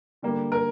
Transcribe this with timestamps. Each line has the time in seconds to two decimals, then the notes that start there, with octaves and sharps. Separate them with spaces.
0.22 D3 G3 A#3
0.52 A#4